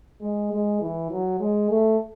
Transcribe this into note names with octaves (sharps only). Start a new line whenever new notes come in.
G#3
G#3
E3
F#3
G#3
A3